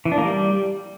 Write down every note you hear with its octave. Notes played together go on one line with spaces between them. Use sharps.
E3
D4
A#3
G3